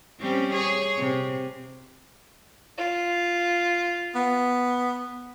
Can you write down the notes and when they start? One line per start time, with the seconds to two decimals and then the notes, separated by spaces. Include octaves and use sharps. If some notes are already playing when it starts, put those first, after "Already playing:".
0.20 G3 C4 C#4
0.53 G#4 C#5
0.97 C3
2.78 F4
4.15 B3